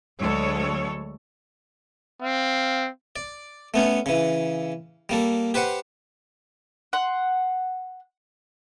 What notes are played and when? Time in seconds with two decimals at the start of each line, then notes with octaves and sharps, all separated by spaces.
0.19 D2 F#3 G#3 A4 C#5
2.22 C4 F5
3.16 D5
3.74 A3 B3 C#4
4.06 C#3 E3
5.09 G3 A#3 A4
5.54 G4 B4 C5 F#5
6.93 F#5 C6